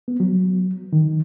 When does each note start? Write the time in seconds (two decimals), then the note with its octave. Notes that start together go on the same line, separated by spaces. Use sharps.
0.08 B3
0.20 F#3
0.93 D#3